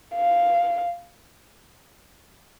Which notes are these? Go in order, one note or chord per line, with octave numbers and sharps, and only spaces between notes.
F5